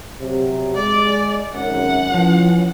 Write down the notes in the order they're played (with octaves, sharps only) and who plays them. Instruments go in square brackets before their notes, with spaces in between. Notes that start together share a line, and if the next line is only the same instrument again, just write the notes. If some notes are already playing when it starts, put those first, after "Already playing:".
[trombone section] C3 F#3
[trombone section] G#3 [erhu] D5
[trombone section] G#1 F#2 [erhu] F#5
[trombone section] E3 C#4 [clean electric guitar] F3